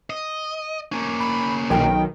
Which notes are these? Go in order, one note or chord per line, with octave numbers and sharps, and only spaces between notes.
D#5
A#3 C#4
B5
B1 D#3 G5